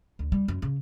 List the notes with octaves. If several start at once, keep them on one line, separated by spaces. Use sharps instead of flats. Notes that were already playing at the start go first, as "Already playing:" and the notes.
D2
G3
F#2
C#3